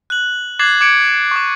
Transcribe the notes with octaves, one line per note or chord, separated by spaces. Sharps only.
F#6 F#7
D6 F#6 G#6 A6 C7 F#7
D6 G#6 C#7 D7 F#7
C#6 D6